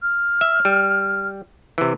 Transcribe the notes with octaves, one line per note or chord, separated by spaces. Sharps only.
F6
E5
G3
C3 E3